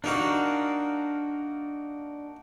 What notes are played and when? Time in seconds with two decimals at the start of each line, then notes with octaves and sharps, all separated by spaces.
0.04 A#3 D4 D#4 F#4 A#4 F5